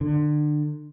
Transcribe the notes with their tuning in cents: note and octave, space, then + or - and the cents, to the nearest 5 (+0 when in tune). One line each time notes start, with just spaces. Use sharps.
D3 +30